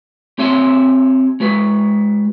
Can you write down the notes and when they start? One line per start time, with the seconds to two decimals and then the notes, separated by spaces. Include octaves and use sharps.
0.38 C4 G4 C#5 E5 G#5 C6
1.40 G#3 F#4 B4